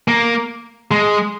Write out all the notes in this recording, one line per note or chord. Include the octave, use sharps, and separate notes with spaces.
A#3
G#3